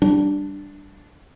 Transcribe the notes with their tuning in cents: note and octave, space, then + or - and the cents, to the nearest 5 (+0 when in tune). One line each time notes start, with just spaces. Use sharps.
G3 -5 D4 +0